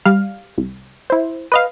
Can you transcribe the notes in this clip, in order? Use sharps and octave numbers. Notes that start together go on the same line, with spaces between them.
G3 F5
C2
E4 C5
B4 D#5 F5